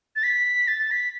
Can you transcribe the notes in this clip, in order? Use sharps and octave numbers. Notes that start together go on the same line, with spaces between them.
A6
B6
A6
B6